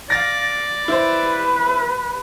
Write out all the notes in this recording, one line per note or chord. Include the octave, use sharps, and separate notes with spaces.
D5 F5 A6 A#6
E4 B4 C5